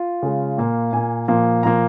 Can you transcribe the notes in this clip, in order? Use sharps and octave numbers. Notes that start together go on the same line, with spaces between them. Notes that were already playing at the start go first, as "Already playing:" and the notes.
Already playing: F4
C#3 G#3
A#2 A#3
A#2 A#3 G#5
A#2 F3 A#3
A#2 F3 A#3 A#5